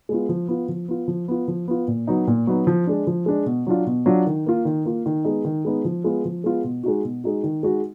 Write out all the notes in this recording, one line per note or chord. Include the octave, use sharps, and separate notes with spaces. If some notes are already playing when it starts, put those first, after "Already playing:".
G#3 B3 F4
F3
B3 F4
F3
B3 F4
F3
B3 F4
F3
B3 F4
A#2
F#3 B3 D#4
A#2
F#3 B3 D#4
F3
G#3 D4
F3
G#3 D4
B2
F#3 D4 F4
B2
F#3 D4 F4
D#3
A#3 F4
D#3
A#3 F4
D#3
G#3 B3 D#4
D#3
G#3 B3 D#4
F3
G#3 B3 F4
F3
G#3 B3 F4
B2
G#3 D#4 F#4
B2
G#3 D#4 F#4
D#3
G#3 D#4 F#4